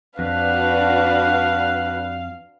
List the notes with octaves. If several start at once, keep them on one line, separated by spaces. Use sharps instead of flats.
F2 D4 F#4 B4 F5 F#6